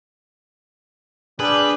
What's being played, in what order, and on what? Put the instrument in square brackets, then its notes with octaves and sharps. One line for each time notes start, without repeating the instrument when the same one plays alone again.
[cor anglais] G3 [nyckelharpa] D4 [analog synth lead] G#4 [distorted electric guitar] B4